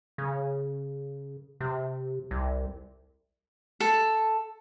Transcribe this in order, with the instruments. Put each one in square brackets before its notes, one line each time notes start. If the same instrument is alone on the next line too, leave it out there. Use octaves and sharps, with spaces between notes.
[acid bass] C#3
C3
C2
[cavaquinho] A4